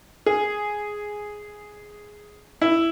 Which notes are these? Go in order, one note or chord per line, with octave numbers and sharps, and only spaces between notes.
G#4
E4